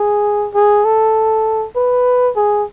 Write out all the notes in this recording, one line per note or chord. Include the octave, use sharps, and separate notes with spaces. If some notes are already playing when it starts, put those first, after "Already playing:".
Already playing: G#4
G#4
A4
B4
G#4